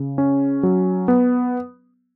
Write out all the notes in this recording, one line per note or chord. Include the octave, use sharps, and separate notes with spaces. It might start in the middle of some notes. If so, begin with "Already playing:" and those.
Already playing: C#3
C#4
F#3
B3